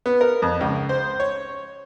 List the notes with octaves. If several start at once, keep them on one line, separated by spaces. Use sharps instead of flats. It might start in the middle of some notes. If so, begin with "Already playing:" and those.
B3
A#4
F2
C#2
C5
C#5